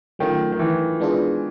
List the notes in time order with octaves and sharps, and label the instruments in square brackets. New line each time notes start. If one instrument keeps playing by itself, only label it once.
[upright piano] D#3 [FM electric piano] F#3 A3 C#4 F4
[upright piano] D#3
E3
[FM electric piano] G#3 B3 D4 F4 G#4